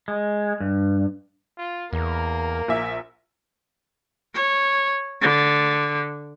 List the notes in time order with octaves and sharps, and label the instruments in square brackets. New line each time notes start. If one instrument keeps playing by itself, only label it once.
[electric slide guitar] G#3
G2
[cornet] F4
[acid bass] E2 [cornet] A#3 [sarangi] A#4
[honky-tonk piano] A#1 E5
[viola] C#5
D3